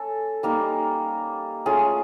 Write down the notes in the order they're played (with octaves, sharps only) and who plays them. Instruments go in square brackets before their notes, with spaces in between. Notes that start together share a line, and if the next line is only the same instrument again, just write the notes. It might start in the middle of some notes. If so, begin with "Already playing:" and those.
Already playing: [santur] C#4 A4
G3 A#3 D#4
A3 C#4 F4 G#4